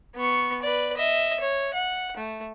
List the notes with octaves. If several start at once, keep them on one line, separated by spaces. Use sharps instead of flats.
B3 C#6
B4 D5
D#5 E5
C#5
F#5
A3